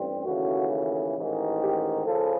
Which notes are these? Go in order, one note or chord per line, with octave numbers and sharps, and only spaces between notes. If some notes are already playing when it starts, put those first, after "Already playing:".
Already playing: A1 G2 G3 C4
D#2 C#3 E3 A3 F#4
A1 G#2 D#3
G4
C#3 F3 A4